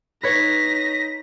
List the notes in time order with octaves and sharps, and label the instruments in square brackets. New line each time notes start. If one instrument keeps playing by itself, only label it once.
[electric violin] D#4 A#6 [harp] B4 C#5 [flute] B6